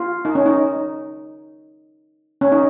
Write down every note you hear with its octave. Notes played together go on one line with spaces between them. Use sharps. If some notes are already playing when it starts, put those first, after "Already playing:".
Already playing: F4
D#4
C#4
D#4
C#4
D#4